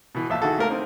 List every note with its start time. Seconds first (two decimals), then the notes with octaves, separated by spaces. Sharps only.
0.15 B2 E3
0.30 A#1 E5 A5
0.42 D#3 E4 F#4 G#4 A4
0.58 A3 A#3 A#4
0.70 C4 D#4